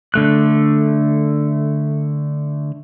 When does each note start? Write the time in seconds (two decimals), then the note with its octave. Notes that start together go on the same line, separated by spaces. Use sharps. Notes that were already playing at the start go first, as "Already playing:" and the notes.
0.14 D3 A3 F#6